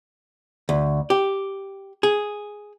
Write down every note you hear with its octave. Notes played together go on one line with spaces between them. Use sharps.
D2
G4
G#4